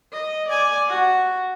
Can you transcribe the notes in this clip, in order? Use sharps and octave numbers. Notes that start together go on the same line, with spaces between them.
D#5
D5 G#5
F#4